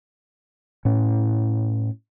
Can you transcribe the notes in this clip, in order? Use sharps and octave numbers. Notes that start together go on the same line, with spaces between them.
A2 C#4